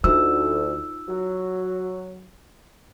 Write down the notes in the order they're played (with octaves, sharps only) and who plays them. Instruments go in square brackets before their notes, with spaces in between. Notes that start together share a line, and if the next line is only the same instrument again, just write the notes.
[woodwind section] D2 [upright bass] D#4 F4 [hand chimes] E6
[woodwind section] F#3